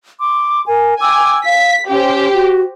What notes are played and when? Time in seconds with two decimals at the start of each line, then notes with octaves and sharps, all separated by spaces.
0.20 C6 D6
0.67 A#4 G#5
1.01 G5 G#5 D6 E6
1.44 F5 B6
1.88 C#4 G4 C5
2.33 F#4